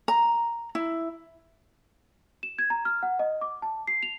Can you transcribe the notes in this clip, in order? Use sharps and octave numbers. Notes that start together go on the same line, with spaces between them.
A#5
E4
E7
G#6
A#5
F6
F#5
D#5
D6
A5
C7
F7